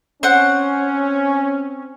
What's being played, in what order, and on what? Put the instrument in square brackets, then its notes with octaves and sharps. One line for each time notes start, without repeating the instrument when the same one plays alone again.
[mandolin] C4 F#5 [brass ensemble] C#4